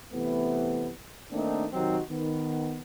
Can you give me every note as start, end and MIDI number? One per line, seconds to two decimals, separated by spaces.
0.13 0.89 48
0.13 0.89 52
0.13 0.89 57
0.13 0.89 59
1.32 1.66 51
1.32 1.66 57
1.32 1.66 58
1.32 1.66 60
1.32 1.66 62
1.32 1.66 63
1.73 1.99 48
1.73 1.99 51
1.73 1.99 54
1.73 1.99 60
1.73 1.99 63
1.73 1.99 66
2.11 2.80 51
2.11 2.80 59